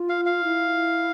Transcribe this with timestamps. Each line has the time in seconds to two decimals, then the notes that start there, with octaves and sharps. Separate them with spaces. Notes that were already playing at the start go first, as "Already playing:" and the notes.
Already playing: F4
0.09 F5
0.26 F5
0.44 E4